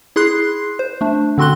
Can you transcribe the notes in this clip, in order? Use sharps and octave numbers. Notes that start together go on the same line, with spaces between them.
E4 G#4 C6 F#6 C7
C5
A3 D4
D3 C4 F#4 C6 F#6 G7